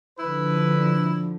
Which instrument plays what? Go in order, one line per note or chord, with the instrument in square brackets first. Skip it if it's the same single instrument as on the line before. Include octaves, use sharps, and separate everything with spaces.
[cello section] D3 F3 [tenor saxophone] E4 [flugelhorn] B4